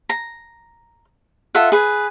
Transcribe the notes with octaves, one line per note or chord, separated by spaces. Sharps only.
A#5
F4 A4 E5 F#5
G#4 B4